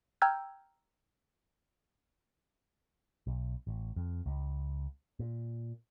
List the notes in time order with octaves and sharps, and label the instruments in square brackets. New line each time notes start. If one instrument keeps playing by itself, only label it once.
[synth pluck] G5 A#5 E6 F6 G6 G#6
[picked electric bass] B1
A1
F2
C#2
A#2